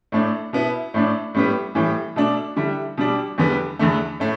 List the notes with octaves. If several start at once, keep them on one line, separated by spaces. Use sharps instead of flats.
A2 A3 D4
B2 B3 E4
A2 A3 D4
A2 G3 B3
A2 E3 G3
B2 A3 D4
D3 G3 E4
B2 G3 D4
E2 D3 G3 B3
E2 D3 A3
A2 A3